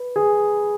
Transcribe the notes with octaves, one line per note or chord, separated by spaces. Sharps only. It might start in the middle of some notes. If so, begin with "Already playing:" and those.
Already playing: B4
G#4